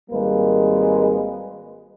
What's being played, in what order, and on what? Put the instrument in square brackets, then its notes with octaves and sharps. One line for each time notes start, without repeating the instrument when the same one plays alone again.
[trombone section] G#1 G3 G#3 A#3 B4